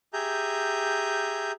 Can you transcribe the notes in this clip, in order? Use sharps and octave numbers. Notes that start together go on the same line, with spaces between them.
G4 G#4 E5 G#5 A#5 G6